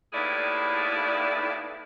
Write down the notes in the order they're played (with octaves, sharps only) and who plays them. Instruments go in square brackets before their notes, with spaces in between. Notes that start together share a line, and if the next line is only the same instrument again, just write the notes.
[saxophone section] D#2 A2 B3 E4 G#4 D5